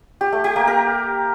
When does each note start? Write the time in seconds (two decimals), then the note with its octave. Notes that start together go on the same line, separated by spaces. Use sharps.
0.21 G4
0.32 A3
0.44 G4
0.56 A#3
0.67 A#4